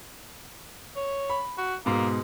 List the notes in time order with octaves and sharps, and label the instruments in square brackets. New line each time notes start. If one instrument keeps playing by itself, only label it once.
[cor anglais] C#5
[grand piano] B5
[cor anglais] F#4
[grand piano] G#2 B2 [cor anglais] A#3